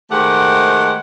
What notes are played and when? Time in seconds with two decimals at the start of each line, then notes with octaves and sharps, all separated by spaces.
0.11 D#3 G#3 A3 G4 C5 F#5